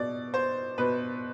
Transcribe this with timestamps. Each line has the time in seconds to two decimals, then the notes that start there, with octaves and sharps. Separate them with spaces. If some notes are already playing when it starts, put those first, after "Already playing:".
Already playing: B2 D5
0.34 C5
0.78 B2 B4